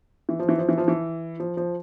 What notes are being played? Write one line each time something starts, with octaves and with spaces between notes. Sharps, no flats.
E3
F3
E3
F3
E3
F3
E3
F3
F3